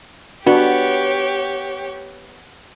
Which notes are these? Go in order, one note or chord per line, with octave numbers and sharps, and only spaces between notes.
B3 D4 F#4 G4 C#5